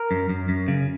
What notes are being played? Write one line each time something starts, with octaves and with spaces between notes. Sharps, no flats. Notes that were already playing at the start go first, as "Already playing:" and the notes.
Already playing: A#4
F#2
F#2
F#2
C#3